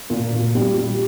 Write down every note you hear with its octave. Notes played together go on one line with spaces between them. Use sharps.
A#2
A#2
G3
G3